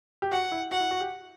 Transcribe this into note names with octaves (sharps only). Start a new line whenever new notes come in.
G4
F#4 F#5
E4
F#4 F#5
E4
F#4
G4